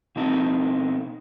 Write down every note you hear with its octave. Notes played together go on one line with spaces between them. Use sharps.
B2 C4 D#4